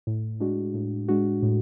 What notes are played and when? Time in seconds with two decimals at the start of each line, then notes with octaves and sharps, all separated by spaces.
0.07 A2
0.40 G#3 D4 F#4
0.74 A2
1.08 G#3 D4 F#4
1.42 A2